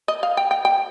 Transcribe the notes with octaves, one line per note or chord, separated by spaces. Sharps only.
D#5
F5
G5
G5
G5